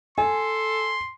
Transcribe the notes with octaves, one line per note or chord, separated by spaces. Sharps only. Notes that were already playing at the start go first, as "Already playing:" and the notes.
A4 G#5 C6